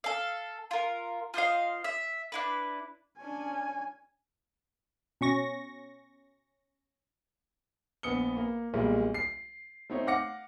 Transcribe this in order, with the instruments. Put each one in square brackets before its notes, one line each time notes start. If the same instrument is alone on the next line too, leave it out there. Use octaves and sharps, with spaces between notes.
[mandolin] A4 F5
F4 A#4
F4 C5 D#5 F5
E5
D4 E4 B4
[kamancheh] C#4 D4 [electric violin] G#5
[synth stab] B2 C#4 C#6 A#6
[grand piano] A#1 B3 D#6 C#7 G7
A#3
B1 A#2 G3 G#3
C7
A3 C4 D#4 C#5
F5 F#5 D6 A#6 C#7